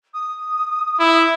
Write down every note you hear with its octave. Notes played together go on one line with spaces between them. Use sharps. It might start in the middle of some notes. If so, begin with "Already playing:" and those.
D#6
E4